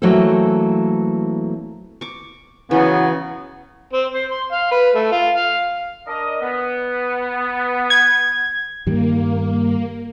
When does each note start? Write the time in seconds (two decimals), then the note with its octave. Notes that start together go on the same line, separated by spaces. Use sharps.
0.02 E3 F#3 A3 A#3 C4 A4
2.01 C#6 D6
2.71 C#3 E3 F#3 B3
3.93 C4
4.14 C5
4.30 C6
4.52 F5
4.71 B4
4.95 A3
5.12 F4
5.35 F5
6.07 D4 A#4 D#5
6.41 B3
7.90 G#6
8.87 G2 D#3 G3 A#3